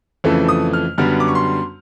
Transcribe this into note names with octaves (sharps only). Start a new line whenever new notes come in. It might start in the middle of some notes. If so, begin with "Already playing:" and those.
F2 C#3 E3 A3
D#6
F6
F#2 D3 G3 B3 F6
D6
C#6
C6